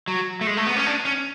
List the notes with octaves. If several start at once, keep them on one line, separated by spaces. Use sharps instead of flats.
F#3
A3
G#3
A3
B3
C#4
D4
C#4